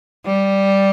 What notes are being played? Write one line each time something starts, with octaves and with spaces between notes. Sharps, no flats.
G3